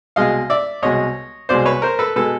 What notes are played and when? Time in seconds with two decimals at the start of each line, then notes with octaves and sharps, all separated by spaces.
0.16 C2 B2 G#3 D#5 F5
0.50 D5 E5
0.82 C2 B2 G#3 C#5 D#5
1.49 C2 B2 G#3 C5 D5
1.66 B4 C#5
1.82 A#4 C5
1.99 A4 B4
2.16 B2 G#3 A4 B4